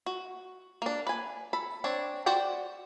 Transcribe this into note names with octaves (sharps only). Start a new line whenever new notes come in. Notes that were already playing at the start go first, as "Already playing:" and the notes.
F#4
A#3 D4
B4 G#5
A4 B5
C4 D4 C#5
F#4 C5 D5 F#5 G5